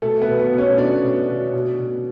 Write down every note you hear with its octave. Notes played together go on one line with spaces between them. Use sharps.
B2 A3 A4
B3 B4
B2
B3 B4
B2
C#4 C#5
B2 D4 D5
B2
B2
B2
B2